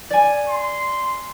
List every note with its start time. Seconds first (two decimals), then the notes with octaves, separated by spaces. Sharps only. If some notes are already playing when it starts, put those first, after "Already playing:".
0.10 D5 G#5
0.49 C6